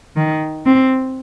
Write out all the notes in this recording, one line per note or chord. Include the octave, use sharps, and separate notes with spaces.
D#3
C4